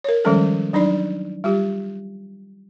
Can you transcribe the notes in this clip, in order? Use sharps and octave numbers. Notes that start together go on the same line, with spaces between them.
A#4 C#5
D#3 F3 G3 G#3 C#4 A4
F#3 D4 D#4 D5
G3 F4 G4